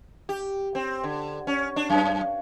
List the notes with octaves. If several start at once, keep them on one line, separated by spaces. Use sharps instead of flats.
G4
C4
D3
C#4
D4
F#2